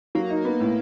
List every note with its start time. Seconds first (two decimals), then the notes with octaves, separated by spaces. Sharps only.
0.15 F#3 A#3
0.30 D#4
0.45 B3
0.60 A2